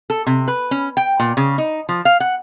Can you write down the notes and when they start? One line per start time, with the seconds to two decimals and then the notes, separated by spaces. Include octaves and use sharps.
0.10 A4
0.27 C3
0.48 B4
0.71 C#4
0.97 G5
1.20 A#2
1.37 C#3
1.58 D#4
1.89 F3
2.05 F5
2.20 F#5